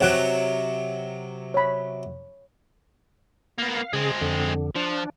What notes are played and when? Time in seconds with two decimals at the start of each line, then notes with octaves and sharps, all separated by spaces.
0.01 C3 F#3 C#5 F#5
1.54 C#5 B5
3.58 A#3 B3 F5
3.93 C#3 G#3 C4 G#4
4.21 F2 D3
4.76 F3 D4